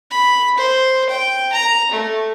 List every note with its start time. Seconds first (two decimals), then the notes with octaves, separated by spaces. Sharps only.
0.11 B5
0.58 C5
1.10 G5
1.53 A#5
1.91 A3